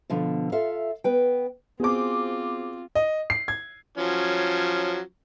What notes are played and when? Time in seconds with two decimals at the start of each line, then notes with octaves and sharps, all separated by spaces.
0.10 B2 D3 F3
0.52 F4 A4 E5 F5
1.04 B3 B4 G5
1.80 B3 C4 F4 F#4 G#4 C5 D6
2.95 D#5
3.30 C7
3.48 G#6
3.98 F3 F#3 C#4